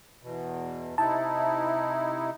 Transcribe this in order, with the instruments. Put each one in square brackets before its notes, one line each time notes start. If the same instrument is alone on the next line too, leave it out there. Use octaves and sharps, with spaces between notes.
[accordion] E2 B2
[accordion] C3 D#4 E4 [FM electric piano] A5